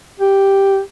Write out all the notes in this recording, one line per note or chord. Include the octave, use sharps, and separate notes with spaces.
G4